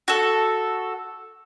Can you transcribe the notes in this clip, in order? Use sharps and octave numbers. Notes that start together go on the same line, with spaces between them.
F#4 A4